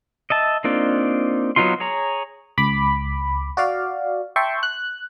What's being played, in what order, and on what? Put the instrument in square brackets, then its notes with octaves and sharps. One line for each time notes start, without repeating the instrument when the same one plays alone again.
[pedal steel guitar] D#5 E5 A5
A#3 C4 D4 D#4 F4
F#3 B3 D#4 F4 C6
G#4 C#5 A#5
[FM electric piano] C#2 B5 D6
F#4 D5 F5
E5 G5 A5 C6 C#6
F#6